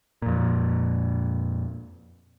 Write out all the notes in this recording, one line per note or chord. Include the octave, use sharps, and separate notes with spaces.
F2 A#2